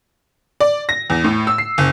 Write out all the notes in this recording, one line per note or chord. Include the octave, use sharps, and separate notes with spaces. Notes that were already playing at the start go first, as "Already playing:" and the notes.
D5
A#6
E2
A2
E6
C7
F#1